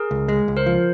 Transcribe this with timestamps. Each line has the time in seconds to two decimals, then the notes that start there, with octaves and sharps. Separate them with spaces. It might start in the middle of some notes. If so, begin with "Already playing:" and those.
Already playing: G#4 A#4
0.11 C#2
0.28 G#3
0.48 C#2
0.57 A#4 C5
0.66 F3